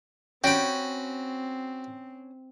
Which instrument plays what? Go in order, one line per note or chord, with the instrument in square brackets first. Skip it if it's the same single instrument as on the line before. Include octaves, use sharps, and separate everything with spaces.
[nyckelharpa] C4 [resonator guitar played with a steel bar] C#4 [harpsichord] F#4 B5 [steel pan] G5